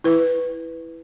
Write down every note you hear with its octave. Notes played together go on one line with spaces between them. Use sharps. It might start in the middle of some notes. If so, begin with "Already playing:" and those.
E4 B4